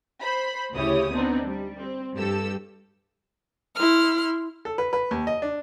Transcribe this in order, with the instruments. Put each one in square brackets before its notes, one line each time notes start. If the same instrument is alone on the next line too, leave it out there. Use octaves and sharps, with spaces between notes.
[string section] C5 B5
D2 C#3 E4 G4 C#5 D#6
B3 C4 D4 D#4
G3
C4
G2 G4 A4 E6
[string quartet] E4 C6 F6
[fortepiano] A4
B4
B4
D#2
D#5
D4